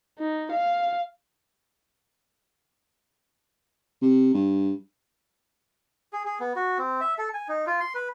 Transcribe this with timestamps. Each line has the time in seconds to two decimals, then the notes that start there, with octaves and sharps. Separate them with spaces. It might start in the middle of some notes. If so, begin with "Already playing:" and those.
0.19 D#4
0.51 F5
4.02 C3
4.34 G2
6.13 G#4
6.25 G#4
6.40 B3
6.56 F#4
6.78 C4
7.01 E5
7.18 A4
7.34 G#5
7.49 D#4
7.67 F4
7.80 C6
7.95 B4